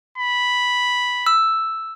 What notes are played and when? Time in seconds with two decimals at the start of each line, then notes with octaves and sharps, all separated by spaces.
0.18 B5
1.26 E6